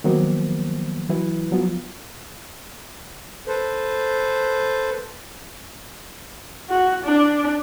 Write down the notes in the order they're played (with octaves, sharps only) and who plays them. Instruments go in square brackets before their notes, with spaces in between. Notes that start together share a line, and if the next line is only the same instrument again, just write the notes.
[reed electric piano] D#3 F3 F#3 A#3 B3 C5
E3 F#3 E4 B4
F3 F#3 B3 F4
[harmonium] A4 B4 C5
[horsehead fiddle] F#4
D4